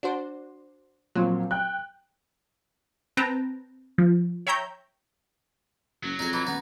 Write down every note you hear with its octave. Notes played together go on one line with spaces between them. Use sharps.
D4 F#4 C5
A#2 F3 F#3 C4
G5 F#6
C4 B4 G5 A5 A#5
F3
C#5 E5 G5 A#5 G6
F#1 F#3
F2 D#4 G#4
E3 D#4
D#1 B3 D#4